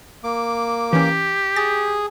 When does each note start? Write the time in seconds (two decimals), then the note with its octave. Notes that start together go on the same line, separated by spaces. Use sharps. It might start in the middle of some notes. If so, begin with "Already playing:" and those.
0.24 A#3 D6
0.93 E3 C#4 G4
1.56 G#4 A6